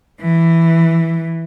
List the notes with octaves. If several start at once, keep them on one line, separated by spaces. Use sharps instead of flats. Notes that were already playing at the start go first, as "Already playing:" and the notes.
E3